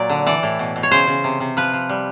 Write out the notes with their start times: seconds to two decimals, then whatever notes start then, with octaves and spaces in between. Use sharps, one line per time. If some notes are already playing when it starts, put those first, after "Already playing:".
Already playing: A#2 F#3 D5
0.10 D3
0.27 E3 D5
0.43 A2
0.59 B2
0.76 B2
0.83 C#5
0.91 C#3 C5
1.07 C#3
1.24 C3
1.40 C3
1.57 F3 B4
1.73 F3
1.89 G3